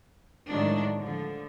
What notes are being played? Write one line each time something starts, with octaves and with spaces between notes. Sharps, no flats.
A2 D#3 F#3 G#3 D4
D3 F3